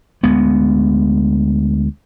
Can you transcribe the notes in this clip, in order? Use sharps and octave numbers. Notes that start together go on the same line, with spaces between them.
D2 G#3 B3